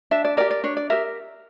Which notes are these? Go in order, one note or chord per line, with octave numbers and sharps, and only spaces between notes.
D4 E5
D5
G4 A#4 D5
D5
D4 C#5
D5
G4 A#4 E5